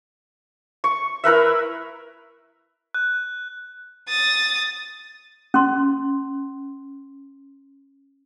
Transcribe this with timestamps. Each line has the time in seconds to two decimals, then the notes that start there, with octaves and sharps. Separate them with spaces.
0.84 C#6
1.24 E4 A#4 B4 E5
2.94 F#6
4.09 D#6 A6
5.54 C#4 C6